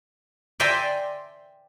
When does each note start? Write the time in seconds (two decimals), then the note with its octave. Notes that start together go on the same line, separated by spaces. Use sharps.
0.60 D5 E5 G5 G#5 A#5 C6